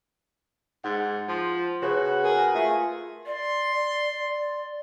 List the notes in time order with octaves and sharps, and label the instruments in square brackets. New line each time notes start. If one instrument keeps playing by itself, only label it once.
[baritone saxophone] G#2 [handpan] F#5
[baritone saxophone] F3
[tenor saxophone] C#3 [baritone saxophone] F#4 [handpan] B4
[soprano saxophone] G#4 [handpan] A#4
[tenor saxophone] A3 [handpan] F4 [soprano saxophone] G#4
[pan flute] D5 [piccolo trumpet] C6